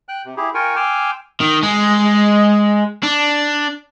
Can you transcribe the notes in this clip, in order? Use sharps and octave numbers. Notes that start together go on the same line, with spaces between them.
G5 F#6
C3
E4 G4 G#4
F4 A#4 G5 G#5 C#6
G5 G#5 C6 D6 E6 F6
D#3
G#3
D4